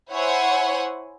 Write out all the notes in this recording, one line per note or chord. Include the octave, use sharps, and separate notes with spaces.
E4 C5 C#5 E5 F#5 G#5